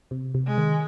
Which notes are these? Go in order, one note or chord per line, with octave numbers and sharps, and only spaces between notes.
C3
C3
G#3
D#3